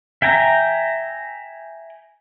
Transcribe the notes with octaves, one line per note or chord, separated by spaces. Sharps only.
E5 G5 G#5 A#5